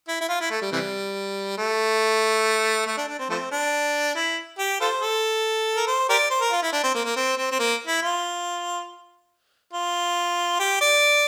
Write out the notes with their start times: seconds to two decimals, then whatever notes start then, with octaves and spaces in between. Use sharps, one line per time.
0.08 E4
0.21 E4
0.29 F4
0.40 E4
0.50 A3
0.62 G3
0.72 C3 E3 G3
1.58 A3
2.86 A3
2.97 D4
3.08 D4
3.19 C4
3.30 F3 A3 C4
3.51 D4
4.15 E4
4.58 G4
4.80 F4 A4 C5
5.02 A4
5.76 A#4
5.87 C5
6.09 G4 A#4 D5
6.30 C5
6.41 A#4
6.51 F4
6.62 E4
6.72 D4
6.84 C4
6.94 A#3
7.05 A#3
7.16 C4
7.38 C4
7.51 C4
7.59 A#3
7.87 E4
8.02 F4
9.73 F4
10.59 G4
10.81 D5